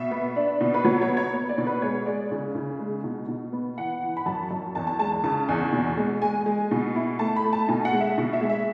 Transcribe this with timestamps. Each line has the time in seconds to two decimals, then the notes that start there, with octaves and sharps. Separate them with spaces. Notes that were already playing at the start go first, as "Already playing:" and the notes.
Already playing: B2 E5
0.11 B3
0.36 D4
0.61 B2
0.74 B4
0.85 F#3 C#5
1.02 C#5
1.09 B3
1.17 C#5
1.33 B3 C#5
1.49 D5
1.58 B2
1.67 B4
1.82 G#3 C#5
2.06 G#3 D5
2.31 C#3
2.55 C#3
2.80 G#3
3.04 B2
3.28 B2
3.53 B3
3.78 E3 F#5
4.03 E3
4.17 B5
4.26 F#2 A5
4.51 F#2
4.75 E2 A5
4.87 A5
4.99 G#3 A5
5.12 A5
5.24 C#3 A5
5.49 E2 G#5
5.72 B2
5.97 G#3
6.22 G#3 G#5
6.46 G#3
6.71 B2
6.95 E4
7.19 A3 A5
7.36 B5
7.45 A3
7.53 A5
7.68 B2 G#5
7.85 F#5
7.93 G#3
8.00 E5
8.18 B2
8.33 E5
8.41 G#3
8.49 E5